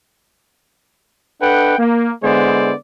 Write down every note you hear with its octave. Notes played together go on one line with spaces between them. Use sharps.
D4 A4 B4 D#5 F#5 G5
A#3
D3 G#3 B3 E4 C5 D5